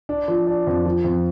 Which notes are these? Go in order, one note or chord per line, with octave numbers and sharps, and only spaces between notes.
D4
F3
D4
F2
F3
F2